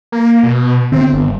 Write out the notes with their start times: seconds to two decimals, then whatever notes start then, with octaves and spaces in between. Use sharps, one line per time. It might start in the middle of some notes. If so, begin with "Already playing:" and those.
0.12 A#3
0.43 B2
0.92 D3 B3 C4
1.13 G1